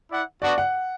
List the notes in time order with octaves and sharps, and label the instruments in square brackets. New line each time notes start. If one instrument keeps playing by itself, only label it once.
[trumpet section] E4 D5 F#5
[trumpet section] B3 D4 F#4 [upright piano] D5
[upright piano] F#5